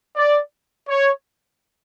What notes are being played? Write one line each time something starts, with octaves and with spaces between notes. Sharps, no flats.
D5
C#5